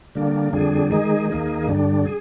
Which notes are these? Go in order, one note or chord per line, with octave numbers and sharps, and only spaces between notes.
D3 G3 A#3 D4
F2 D3 G3 D4 G#4
D#3 G#3 D#4 G#4
D#2 D#3 A#3 D#4 G#4
G2 D3 G3 D4
G#4